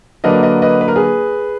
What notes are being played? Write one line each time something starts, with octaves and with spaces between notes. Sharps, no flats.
D3 F#3 A#3 D4 B4 D#5
B4 D#5
B4 D#5
B4
A#4
G#4 B4